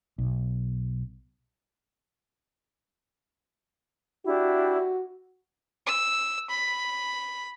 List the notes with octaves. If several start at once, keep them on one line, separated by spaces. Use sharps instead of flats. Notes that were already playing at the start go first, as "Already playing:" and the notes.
B1
D4 E4 F#4 G4
E6
B5